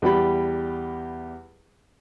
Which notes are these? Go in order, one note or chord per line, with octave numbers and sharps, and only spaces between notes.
E2 G3 G4 B5